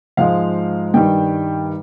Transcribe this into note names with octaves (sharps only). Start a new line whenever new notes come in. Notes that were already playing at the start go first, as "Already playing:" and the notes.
G#2 F3 G#3 F5
G2 D#3 G3 G5